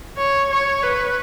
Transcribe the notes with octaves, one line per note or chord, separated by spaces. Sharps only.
C#5
C#5
B4